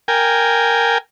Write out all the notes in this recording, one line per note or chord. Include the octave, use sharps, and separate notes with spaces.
A#4 G5 G#5